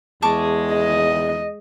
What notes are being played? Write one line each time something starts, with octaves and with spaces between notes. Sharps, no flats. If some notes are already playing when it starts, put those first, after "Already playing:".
E2 G#3 G#4 A5 C#6 D6
D#5